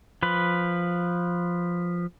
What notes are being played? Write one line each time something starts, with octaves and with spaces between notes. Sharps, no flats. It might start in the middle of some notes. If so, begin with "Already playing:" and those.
F3 B4